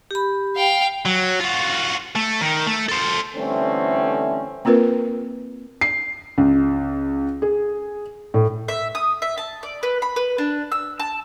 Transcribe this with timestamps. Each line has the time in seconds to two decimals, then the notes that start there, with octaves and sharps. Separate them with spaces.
0.11 G4 B5
0.57 F5 G5
1.05 F#3
1.40 F4 F#4
2.16 A3
2.41 D#3
2.67 A3
2.89 A4 C5
3.36 D3 E3 G3 A3 C4 C#4
4.65 A#3 C4 F4 A#4 B4
5.81 C7
6.38 C#2
7.42 G#4
8.34 A2
8.68 E5
8.95 D#6
9.22 E5
9.38 A5
9.63 D5
9.83 B4
10.02 B5
10.16 B4
10.38 D4
10.72 E6
10.99 A5